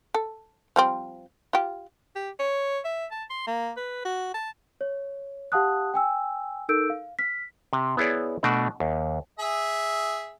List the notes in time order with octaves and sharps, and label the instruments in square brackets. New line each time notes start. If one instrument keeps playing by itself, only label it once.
[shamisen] A4
F3 G3 C4
F4 G4
[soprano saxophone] G4
C#5
E5
A5
C6
A#3
B4
F#4
A5
[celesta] C#5
G4 F5 F#5 A5 D#6 F#6
G5 G#5 E6
D#4 A4 A#4 E6 G6 D7
F5
F6 B6
[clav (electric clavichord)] C3
B3 E4 G#4 C#5 D5
B2 A3 D4 F#4 D5
D#2
[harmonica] G#4 E5